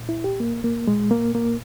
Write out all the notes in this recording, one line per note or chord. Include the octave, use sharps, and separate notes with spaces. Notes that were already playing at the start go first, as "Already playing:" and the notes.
Already playing: A#2
E4
G4
A#3
A#3
A#2 G#3
A#3
A#3